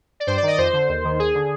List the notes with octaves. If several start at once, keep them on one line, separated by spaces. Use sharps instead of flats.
D5
G2 C5
D5
D#3
D#5
F2 C5
D3
D#2
D#3
D#2 G#4
D3